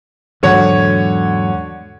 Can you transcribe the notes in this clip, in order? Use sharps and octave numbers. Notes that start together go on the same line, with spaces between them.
E2 G#2 D3 F#3 C#5 F#5